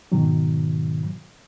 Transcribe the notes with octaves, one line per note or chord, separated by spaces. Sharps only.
G#2 B2 D#3 F#3